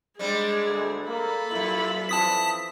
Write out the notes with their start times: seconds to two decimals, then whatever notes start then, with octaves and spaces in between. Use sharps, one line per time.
0.19 G3 G#3 C4 D4 G#4
0.67 D2
1.08 A#3 A4 B5
1.51 F#2 A#2 A#3 E4
2.09 E3 F3 C4 A5 D#6 B6